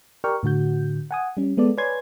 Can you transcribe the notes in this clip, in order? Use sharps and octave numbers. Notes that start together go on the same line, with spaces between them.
G4 A#4 D5 G5 C#6 F6
A2 D3 F#4 G6
F#5 G#5 D#6
G3 C#4
G#3 B3 A4 D5
B4 C#5 D5 G#5 C6 G#6